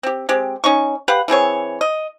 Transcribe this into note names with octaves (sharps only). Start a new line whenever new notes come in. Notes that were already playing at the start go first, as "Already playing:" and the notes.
C4 G4
G#3 C4 G4
C#4 D#4 C#6
G4 B4 F5 F#5
E3 C4 G#4 C#5
D#5